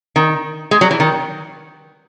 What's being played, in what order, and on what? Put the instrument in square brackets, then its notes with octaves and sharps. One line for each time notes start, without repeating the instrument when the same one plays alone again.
[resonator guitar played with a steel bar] D#3
G#3
F#3
E3
D#3